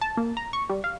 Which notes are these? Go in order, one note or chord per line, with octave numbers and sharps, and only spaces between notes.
A5
A#3
A#5
C#6
G3
F5